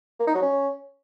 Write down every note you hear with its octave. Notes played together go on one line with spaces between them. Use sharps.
A#3
D#4
F#3
C#4